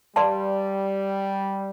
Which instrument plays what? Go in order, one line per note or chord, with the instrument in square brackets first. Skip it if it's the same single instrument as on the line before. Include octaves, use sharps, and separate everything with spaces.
[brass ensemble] G3 [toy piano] B4 D5 F5 A5 C6